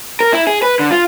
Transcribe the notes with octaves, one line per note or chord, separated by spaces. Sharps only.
A#4
E4
G#4
B4
D3
F4